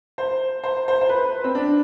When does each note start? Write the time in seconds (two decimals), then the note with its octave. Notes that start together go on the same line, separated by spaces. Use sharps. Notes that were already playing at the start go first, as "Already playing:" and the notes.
0.18 C5
0.64 C5
0.88 C5
1.01 C5
1.09 B4
1.44 C4
1.55 D4